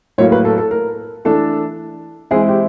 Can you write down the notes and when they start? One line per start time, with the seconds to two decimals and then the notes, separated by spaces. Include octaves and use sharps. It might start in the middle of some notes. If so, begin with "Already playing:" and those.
0.18 A2 F#3 A#3 C#5
0.32 B4
0.45 A4
0.58 A4
0.71 A#4
1.25 E3 A3 D4 A4
2.31 E3 G#3 C4 E4 G#4
2.49 G4